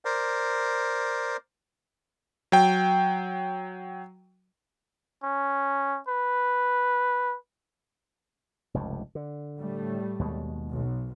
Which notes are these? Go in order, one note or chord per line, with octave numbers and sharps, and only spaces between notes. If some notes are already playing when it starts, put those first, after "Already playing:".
A#4 C5 D5
F#3 G5
C#4
B4
F1 C#2 G2
D3
A2 G3 A3
D#2 B2 G#3
B1